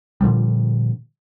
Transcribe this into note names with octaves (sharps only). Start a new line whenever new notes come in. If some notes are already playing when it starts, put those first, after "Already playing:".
A#2 D3 F3 G3